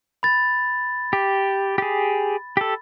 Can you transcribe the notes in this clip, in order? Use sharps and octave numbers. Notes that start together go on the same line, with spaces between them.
B5 A6
G4
G4 G#4
G4 A4